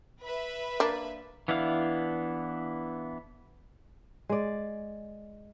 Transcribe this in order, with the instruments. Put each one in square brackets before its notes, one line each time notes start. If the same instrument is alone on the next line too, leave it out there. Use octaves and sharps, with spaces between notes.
[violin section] B4 E5 B5
[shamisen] A#3 D4
[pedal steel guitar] E3 B3 D4 E4 F5
[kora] G#3 D5